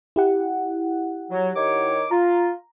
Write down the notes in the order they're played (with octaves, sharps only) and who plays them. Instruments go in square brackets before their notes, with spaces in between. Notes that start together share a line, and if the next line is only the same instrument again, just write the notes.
[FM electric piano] E4 G4 F#5
[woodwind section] F#3
D#3 C#5 D6
[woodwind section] F4 [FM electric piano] A#5